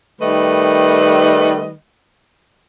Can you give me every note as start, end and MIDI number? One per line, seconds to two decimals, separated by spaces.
0.21 1.73 51
0.21 1.73 55
0.21 1.73 57
0.21 1.73 71
0.21 1.73 75